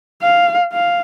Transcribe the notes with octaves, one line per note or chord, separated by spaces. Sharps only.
F5
F5